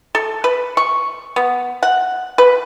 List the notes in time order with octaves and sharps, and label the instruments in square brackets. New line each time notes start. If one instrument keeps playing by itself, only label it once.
[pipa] A4
B4
C#6
B3
F#5
B4